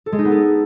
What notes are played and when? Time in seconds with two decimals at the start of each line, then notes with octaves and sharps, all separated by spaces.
0.06 A4
0.12 G#3
0.19 D#4
0.25 B3
0.31 A4